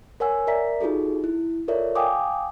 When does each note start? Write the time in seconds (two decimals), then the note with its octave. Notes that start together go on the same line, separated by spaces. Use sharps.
0.20 A#4 C#5 F#5 G#5 E6
0.47 A#4 D5 E5 A#5 B6
0.81 D#4 F4 F#4 G#4 A4
1.24 E4
1.68 F4 A4 A#4 C#5 D5 E5
1.95 F5 G5 G#5 D6 D#6